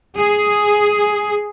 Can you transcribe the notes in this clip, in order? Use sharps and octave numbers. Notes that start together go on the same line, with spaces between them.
G#4